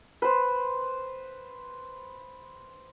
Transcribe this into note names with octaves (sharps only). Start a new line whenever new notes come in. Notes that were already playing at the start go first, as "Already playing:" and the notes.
B4 C5